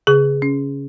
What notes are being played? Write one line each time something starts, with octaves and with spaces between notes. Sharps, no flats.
C#3 G#4
C#4